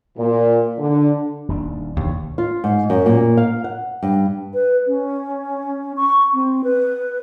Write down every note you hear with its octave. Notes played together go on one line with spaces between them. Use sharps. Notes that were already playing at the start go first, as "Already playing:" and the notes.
A#2
D3
D#1 D#2 D4
E1 D#2
F4
G#2
F#2
A#2
F5
F#5
G2
B4
C#4
C#6
C4
B4